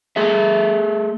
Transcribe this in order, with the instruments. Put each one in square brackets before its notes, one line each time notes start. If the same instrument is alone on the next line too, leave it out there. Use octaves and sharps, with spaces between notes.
[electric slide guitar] A3 G#4 E5